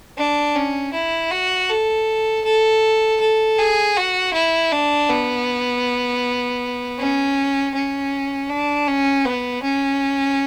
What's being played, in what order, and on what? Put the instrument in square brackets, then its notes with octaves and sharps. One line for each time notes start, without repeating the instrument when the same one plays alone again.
[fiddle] D4
C#4
E4
F#4
A4
A4
A4
G#4
F#4
E4
D4
B3
C#4
C#4
D4
C#4
B3
C#4